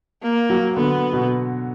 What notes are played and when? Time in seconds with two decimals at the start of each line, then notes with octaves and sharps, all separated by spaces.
0.23 A#3
0.50 F#3
0.76 D3 B3
1.13 B2